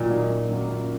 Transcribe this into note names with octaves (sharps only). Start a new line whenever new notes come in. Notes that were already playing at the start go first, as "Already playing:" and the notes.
Already playing: A#2 D#3 F#3 A#3 D#4
F#3 A#3 D#4
F#2
D#3 F#3 A#3
F#2